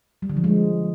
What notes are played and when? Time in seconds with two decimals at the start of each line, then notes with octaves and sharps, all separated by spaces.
0.22 G3
0.30 D3
0.37 F3
0.44 G#3